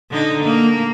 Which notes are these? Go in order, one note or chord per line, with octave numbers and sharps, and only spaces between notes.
D3 D#4
A#3